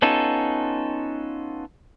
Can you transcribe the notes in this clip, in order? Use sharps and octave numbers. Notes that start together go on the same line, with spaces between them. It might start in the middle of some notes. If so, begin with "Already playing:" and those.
B3 C#4 D#4 F4 A4